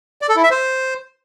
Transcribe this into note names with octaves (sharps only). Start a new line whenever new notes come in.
D5
A4
E4
E5
C5